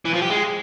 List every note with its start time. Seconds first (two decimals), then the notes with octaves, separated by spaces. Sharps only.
0.05 E3
0.13 F3
0.22 G4
0.30 G#3